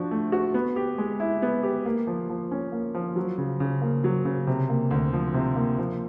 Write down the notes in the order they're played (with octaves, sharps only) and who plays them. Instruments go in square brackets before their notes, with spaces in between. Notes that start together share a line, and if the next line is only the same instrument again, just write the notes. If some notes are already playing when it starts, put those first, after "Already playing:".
Already playing: [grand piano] F3 D4 F#4
A3
F#4
B3
G4
G#3
E4
B3
G4
A#3
F3
F3
C#4
A#3
F3
F#3
C#3
C#3
A#3
F#3
C#3
C3
A#3
D2
F3
C3
A#3
F3